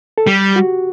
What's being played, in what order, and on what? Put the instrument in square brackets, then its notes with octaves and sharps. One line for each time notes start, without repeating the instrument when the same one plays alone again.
[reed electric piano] A4
[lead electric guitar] G3 [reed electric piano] G4
[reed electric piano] F#4